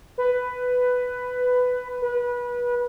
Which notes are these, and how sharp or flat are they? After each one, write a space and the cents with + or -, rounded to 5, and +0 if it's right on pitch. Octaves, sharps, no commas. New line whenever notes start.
B4 +10
B4 -25